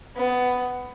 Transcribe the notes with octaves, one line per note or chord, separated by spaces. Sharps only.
B3